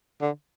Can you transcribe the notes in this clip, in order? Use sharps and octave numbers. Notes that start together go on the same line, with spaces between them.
D3